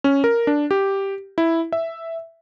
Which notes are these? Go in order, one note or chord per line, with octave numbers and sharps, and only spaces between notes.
C#4
A#4
D4
G4
E4
E5